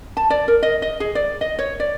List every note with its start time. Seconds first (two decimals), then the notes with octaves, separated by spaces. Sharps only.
0.17 A5
0.30 D5
0.48 A#4
0.63 D#5
0.82 D#5
1.00 G#4
1.15 D5
1.41 D#5
1.59 C#5
1.80 D5